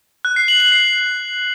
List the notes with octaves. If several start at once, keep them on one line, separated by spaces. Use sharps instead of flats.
F#6
C7
F#7
F#7
C7